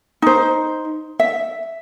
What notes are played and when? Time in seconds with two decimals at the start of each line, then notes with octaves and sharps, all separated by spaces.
0.22 D#4 C5
1.20 E5